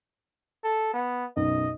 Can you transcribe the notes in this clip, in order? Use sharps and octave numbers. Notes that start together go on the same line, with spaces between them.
A4
B3
B1 F#2 D#5